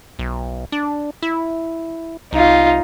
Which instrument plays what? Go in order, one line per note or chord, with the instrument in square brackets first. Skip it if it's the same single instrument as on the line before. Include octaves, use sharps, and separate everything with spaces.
[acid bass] B1
D4
E4
[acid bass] C2 [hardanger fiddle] D#4 F4